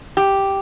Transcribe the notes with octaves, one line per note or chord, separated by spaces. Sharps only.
G4